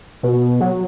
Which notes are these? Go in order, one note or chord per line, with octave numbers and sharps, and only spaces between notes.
B2
F#3